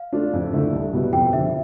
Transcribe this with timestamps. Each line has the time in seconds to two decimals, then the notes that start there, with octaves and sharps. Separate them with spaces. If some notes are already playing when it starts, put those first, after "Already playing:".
Already playing: F5
0.13 A3 D4 F4
0.33 F2
0.53 D3 A3 E4
0.73 C2
0.93 B2 G3 B3 E4
1.13 F2 G5
1.33 D3 F3 E5